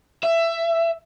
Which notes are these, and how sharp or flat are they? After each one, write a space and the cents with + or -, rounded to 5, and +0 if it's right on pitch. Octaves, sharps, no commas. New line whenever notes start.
E5 +15